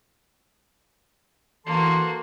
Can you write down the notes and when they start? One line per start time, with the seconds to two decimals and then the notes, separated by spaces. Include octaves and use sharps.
1.66 E3 A#3 F#4 A4 A5 C6